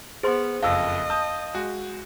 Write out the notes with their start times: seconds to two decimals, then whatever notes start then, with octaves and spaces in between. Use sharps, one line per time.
0.23 B3 G#4 C5 C6
0.63 F#1 F2 D#5 F5 E6
1.10 A5 D#6 G6
1.54 G#3 F#4